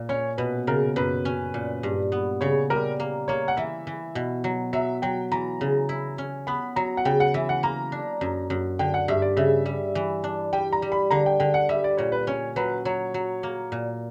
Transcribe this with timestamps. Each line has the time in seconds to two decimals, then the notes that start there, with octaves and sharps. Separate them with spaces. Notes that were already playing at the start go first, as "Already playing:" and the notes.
Already playing: A#2
0.09 C#4 C#5
0.38 B2 B4
0.67 C#3 A#4
0.96 F#2 B4
1.25 C#4
1.54 A#2
1.83 G2
2.12 B3
2.41 C#3 C#5
2.70 G3 A#4
3.00 A#3
3.28 A#3 C#5
3.48 F#5
3.57 E3 E5
3.87 E3
4.15 B2
4.44 F#3
4.73 F#3 E5
5.02 F#3 G5
5.32 E3 A#5
5.61 C#3
5.89 E4
6.18 C#4
6.47 B3 B5
6.76 F#3 A#5
6.97 F#5
7.05 C#3 G5
7.20 F#5
7.34 E3 E5
7.49 F#5
7.63 A#3 A#5
7.92 D4
8.21 F#2
8.50 F#2
8.79 D3 G5
8.94 F#5
9.08 G2 E5
9.22 D5
9.37 C#3 E5
9.66 G3
9.95 E3
10.24 D4
10.53 G3 G5
10.73 A#5
10.82 G3
10.92 B5
11.11 D3 A#5
11.26 G5
11.40 D3 G5
11.54 F#5
11.69 G3 E5
11.84 D5
11.97 A#2 C#5
12.12 B4
12.27 C#4 C#5
12.56 F#3 B4
12.85 F#3 C#5
13.14 F#3
13.43 A#3
13.72 A#2